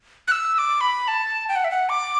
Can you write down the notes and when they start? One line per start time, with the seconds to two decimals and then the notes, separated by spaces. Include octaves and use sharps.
0.28 F#6
0.31 E6
0.54 E6
0.58 D6
0.81 B5
1.08 A5
1.49 G5
1.56 F#5
1.64 E5
1.71 F#5
1.89 D6